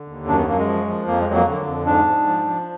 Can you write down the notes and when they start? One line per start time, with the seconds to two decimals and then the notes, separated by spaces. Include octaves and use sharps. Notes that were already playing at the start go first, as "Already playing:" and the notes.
Already playing: D3
0.08 D#2
0.27 F#2 D4
0.37 B3
0.48 F#2 A#3
0.58 G#3
0.67 F3
0.87 F3
1.07 F2 A#3
1.21 G#3
1.27 F#3
1.34 A#3
1.48 D3
1.66 F2
1.86 G#2 D4
2.06 G#2
2.27 F3
2.47 F3